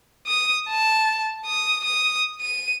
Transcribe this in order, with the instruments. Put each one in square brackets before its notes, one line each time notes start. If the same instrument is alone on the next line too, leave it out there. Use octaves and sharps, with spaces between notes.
[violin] D#6
A5
D#6
D#6
D#7